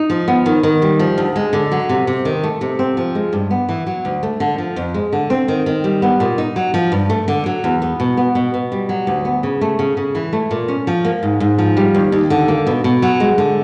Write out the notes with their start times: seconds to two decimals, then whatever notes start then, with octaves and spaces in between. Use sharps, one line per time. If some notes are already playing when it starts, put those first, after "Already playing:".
Already playing: D#4
0.10 F3
0.28 B3
0.46 D#3
0.63 D#3
0.82 G3
0.99 F3
1.18 D2
1.36 G#3
1.53 D3
1.71 F#3
1.89 C3
2.07 C3
2.25 D#3
2.43 A3
2.61 C3
2.79 C4
2.97 F3
3.15 G#3
3.33 G2
3.51 B3
3.69 E3
3.87 F#3
4.05 D2
4.23 A3
4.40 D3
4.58 F3
4.76 F2
4.94 G#3
5.13 D3
5.30 C4
5.48 D#3
5.66 D#3
5.84 G3
6.02 B3
6.20 A#2
6.38 D#4
6.56 F#3
6.74 F3
6.92 G2
7.10 A3
7.28 D3
7.46 F#3
7.64 E2
7.82 B3
8.00 B2
8.17 B3
8.35 B2
8.54 B2
8.72 G3
8.89 F#3
9.07 D2
9.25 B3
9.43 C#3
9.61 A3
9.79 C#3
9.97 C#3
10.15 E3
10.33 A3
10.51 A#2
10.68 C#4
10.87 F3
11.05 A#3
11.23 G#2
11.40 G#2
11.58 F3
11.77 G3
11.95 D#2
12.12 D#2
12.30 D3
12.48 A#3
12.67 B2
12.84 B2
13.02 F#3
13.20 G#3
13.38 D3